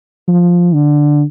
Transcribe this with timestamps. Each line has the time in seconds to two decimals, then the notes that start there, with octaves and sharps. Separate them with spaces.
0.28 F3
0.74 D3